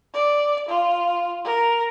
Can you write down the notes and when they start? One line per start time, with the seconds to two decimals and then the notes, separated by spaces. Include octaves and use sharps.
0.14 D5
0.68 F4
1.45 A#4